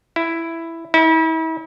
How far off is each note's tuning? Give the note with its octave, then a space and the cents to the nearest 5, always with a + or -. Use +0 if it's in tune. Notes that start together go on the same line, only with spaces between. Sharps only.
E4 +5
E4 -40